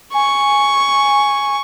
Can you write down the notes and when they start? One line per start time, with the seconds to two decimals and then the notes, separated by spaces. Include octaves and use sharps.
0.14 G#5 C#6